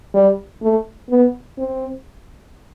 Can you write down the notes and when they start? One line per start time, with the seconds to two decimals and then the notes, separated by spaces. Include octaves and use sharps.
0.14 G3
0.63 A3
1.10 B3
1.58 C4